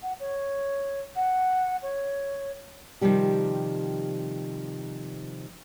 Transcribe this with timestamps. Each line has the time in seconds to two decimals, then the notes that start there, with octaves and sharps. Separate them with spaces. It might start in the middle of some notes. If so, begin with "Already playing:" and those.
0.03 F#5
0.20 C#5
1.16 F#5
1.82 C#5
3.01 C3 D#3 F3 G3 G4